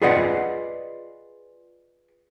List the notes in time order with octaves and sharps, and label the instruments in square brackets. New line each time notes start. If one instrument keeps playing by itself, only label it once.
[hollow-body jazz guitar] F4 G#4 B4 D5 D#5 F#5